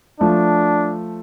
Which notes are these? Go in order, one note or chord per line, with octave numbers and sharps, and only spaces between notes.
F3 A3 D4